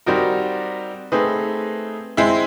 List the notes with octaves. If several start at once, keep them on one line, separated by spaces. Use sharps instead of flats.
G3 C4 D#4 F#4 A#4
A3 C4 D#4 G#4 B4
G#3 C4 E4